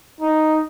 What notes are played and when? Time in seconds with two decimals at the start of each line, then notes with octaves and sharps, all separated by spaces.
0.21 D#4